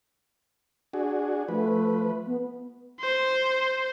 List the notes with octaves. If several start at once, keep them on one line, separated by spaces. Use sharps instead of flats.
D4 F#4 G#4
F3 A3 B4
B3
C5